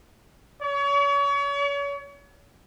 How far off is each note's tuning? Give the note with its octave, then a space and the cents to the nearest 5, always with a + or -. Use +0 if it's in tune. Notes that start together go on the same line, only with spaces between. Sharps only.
C#5 +35